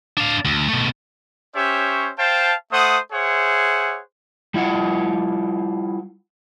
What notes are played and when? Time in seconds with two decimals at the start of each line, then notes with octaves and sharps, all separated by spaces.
0.17 D4 F5
0.45 D2
0.69 B2 A3
1.55 C#4 G4 C5 C#5 E5
2.17 C5 F5 G5 A5
2.71 A3 C5 F#5 D#6
3.12 G#4 C5 C#5 E5 F#5
4.54 G3 E4 F4 F#5